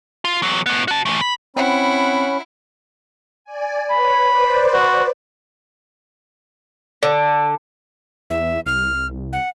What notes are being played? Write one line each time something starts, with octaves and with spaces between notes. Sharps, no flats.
F4
E2 F#3
A2 B3
F#4 A5
E3 A3
B5
C4 C#4 E4 F#5 B5
D5 G#5
B4 C#5 B5
B4 C5 D5
F#4
D3
E2 E5
C2 F6
F#5